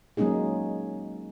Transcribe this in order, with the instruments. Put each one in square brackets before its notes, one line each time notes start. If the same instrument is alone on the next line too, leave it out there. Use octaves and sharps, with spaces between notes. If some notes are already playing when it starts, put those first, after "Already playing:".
[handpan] F#3 G#3 A#3 C#4 D#4 G#4